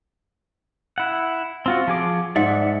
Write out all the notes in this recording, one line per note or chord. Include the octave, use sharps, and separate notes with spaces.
E4 F#5
C4 F4 F#4
F3 G#4 D6
G#2 D5 E5 F#5